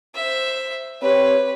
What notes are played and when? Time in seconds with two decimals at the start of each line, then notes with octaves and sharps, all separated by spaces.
0.15 C5 E5
1.02 C4 G4 B4 C#5